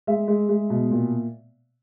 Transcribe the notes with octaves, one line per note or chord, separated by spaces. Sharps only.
G#3 E5
G#3
G#3
B2
A#2